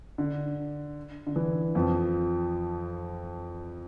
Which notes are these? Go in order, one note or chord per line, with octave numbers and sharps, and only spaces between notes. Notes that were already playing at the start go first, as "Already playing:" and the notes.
D3
D3
E3
F2 F3